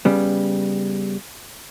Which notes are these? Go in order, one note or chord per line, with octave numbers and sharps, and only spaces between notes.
C#3 G3 B3